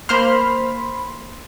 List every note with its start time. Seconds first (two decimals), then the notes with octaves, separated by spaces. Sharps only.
0.09 A#3 C5 B5 C6 F6